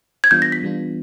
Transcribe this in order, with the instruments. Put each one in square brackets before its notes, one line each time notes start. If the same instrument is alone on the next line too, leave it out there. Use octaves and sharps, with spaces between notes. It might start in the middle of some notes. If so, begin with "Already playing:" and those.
[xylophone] G#6
[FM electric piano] E3 G3 B3 D4 F4 [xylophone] G6
[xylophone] A#6
B6
[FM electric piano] E3 G3 B3 D4 F4